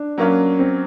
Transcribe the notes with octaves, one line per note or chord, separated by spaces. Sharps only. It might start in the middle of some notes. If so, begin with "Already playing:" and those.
Already playing: D4
F#3 A#3 C#4
C4